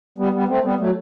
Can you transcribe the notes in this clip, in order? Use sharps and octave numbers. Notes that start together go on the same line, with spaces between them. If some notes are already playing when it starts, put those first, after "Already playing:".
G3 B3
G3 B3
A3 C4
G3 B3
F#3 A3